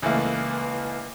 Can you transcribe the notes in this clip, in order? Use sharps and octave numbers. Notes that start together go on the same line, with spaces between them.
C#2 E3 A3 A#3